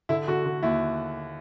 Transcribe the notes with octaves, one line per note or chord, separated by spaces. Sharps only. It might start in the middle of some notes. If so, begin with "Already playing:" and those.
D3 E4
D3 F#4
D3
D#2 E4